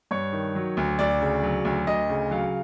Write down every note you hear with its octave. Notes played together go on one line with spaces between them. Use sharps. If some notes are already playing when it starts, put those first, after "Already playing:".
G2 C#5
D#3
F#3
D2
D2 D5
C#3
F#3
D2
D2 D#5
C#3
F#3 F5